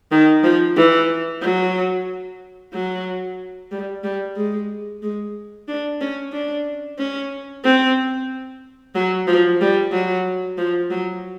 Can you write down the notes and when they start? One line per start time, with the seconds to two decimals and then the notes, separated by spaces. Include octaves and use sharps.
0.12 D#3
0.44 F3
0.77 E3
1.42 F#3
2.73 F#3
3.72 G3
4.04 G3
4.37 G#3
5.02 G#3
5.68 D4
6.01 C#4
6.32 D4
6.98 C#4
7.64 C4
8.95 F#3
9.27 F3
9.61 G3
9.92 F#3
10.58 F3
10.90 F#3